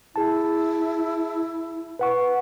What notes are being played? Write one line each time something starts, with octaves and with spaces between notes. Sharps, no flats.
E4 G#4 A5
B4 F#5 C#6